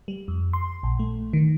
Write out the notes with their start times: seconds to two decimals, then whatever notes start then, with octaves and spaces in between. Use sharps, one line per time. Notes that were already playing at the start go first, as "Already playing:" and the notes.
0.08 G3
0.28 F2
0.53 C6
0.83 A#1
0.99 A3
1.33 D#3